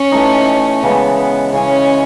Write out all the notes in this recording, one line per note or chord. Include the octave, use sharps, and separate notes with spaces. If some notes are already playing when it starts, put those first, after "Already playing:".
Already playing: C#4
E3 A3 D#4
C#3 E3 G#3 B3
B3
C#3 E3 G#3 C#4